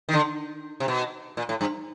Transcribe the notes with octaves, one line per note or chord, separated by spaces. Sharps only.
D#3
D3
C3
B2
A#2
A2
G2